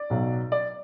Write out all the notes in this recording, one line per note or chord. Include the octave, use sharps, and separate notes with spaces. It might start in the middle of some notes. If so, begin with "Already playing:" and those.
Already playing: D5
B1 B2 F#3
D5